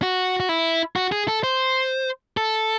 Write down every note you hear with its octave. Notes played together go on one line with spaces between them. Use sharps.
F#4
F#4
E4
F#4
G#4
A4
C5
A4